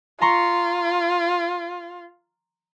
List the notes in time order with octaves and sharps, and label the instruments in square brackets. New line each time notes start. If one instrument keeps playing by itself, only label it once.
[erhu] F4 [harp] A#5 C6 C#6